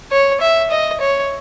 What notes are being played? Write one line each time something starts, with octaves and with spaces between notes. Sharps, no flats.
C#5
E5
D#5
C#5